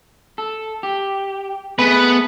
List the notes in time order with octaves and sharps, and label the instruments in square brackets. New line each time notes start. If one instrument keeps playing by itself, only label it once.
[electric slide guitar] A4
G4
[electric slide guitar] A3 G#4 [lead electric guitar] B3 [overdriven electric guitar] B4